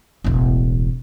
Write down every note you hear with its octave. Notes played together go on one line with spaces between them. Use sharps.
E1 A1